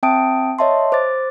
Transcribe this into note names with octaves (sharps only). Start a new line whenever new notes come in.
C4 E5 G5 A5 D#6 D7
C#5 D#5 E5 A5 C6
C5 D6 A6